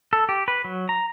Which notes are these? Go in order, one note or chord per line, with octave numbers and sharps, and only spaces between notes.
A4
G4
B4
F#3
A#5